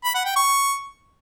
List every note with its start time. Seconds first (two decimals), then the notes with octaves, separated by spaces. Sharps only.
0.04 B5
0.15 F#5
0.25 G5
0.36 C#6